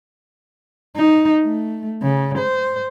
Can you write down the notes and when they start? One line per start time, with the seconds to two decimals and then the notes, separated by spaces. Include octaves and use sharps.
0.96 D#4
1.43 A3
2.02 C#3
2.38 C5